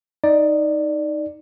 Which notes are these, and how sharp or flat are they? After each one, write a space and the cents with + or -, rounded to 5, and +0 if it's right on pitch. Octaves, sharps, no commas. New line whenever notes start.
D#4 +0 D5 +10